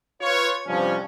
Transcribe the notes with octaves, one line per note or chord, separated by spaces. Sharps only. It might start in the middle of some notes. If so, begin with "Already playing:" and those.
F4 B4 C#5
G2 C3 F3 C#4